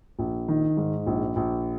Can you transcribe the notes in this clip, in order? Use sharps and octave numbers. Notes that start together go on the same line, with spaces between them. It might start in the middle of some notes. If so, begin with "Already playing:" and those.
A#1
D#3
G#2
A#1
A#1